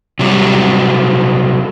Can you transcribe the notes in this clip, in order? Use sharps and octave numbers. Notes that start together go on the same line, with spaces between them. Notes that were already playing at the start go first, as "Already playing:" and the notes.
C3 F#3 G3